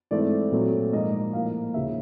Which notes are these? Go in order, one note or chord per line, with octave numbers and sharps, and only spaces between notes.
G#2 E3 A3 C4 D5
A#2 F#3 A3 C4
G#2 F3 A#3 D#5
A2 F3 A#3 F5
D#2 C#3 F3 E5